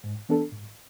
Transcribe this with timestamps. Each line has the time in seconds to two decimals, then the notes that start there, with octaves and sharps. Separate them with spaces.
0.04 G#2
0.29 E3 B3 D4 A4
0.52 G#2